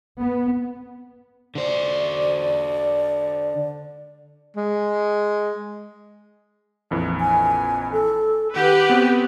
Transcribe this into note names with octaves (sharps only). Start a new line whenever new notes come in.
B3
D3 C5 D5
G#3
A#1 F2 E3
G#5
A4
D#3 G4 B4 F#5
B3 C4 F#4